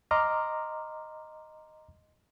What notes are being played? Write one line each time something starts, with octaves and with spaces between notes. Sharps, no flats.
D#5 A#5 C6 D6 F6